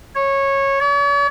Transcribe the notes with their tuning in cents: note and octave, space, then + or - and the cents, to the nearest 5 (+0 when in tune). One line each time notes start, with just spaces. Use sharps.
C#5 -15
C#5 +45